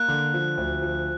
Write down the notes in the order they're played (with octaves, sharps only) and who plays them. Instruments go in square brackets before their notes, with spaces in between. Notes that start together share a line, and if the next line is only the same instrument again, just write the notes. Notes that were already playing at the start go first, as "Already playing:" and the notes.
Already playing: [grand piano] A#3 [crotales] F#6
[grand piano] D3
F3
D2
F3